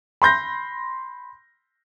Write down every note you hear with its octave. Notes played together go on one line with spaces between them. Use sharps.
B5 C6 G6 A#6